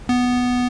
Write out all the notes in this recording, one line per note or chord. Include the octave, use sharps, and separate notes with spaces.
B3